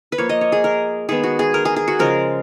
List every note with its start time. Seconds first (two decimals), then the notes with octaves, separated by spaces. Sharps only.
0.12 B4
0.18 F3 A#3 C#5
0.29 D#5
0.41 C#5
0.52 G#4
0.64 A#4
1.09 D#3 G#3 B3 G#4
1.23 F#4
1.39 G#4
1.54 A#4
1.65 G#4
1.76 G#4
1.88 F#4
1.99 C#3 F3 G#3 A#4